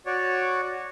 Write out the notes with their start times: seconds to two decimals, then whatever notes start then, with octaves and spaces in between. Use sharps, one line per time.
0.06 F#4 C#5 D5